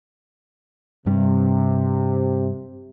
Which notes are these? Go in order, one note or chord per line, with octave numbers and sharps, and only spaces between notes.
G2 C3 G3